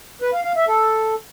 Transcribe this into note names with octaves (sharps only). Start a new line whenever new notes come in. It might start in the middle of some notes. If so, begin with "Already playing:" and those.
B4
F5
F5
E5
A4